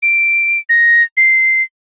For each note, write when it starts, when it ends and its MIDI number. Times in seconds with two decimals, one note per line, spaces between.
0.02 0.59 98
0.69 1.03 94
1.17 1.62 96